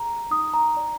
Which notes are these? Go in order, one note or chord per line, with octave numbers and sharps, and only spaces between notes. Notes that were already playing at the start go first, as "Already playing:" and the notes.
Already playing: G#4 A#5
D#4 D#6
A#5
D5